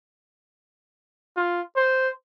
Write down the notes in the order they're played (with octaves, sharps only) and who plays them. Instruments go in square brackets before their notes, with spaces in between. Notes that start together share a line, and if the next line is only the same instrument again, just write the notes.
[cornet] F4
C5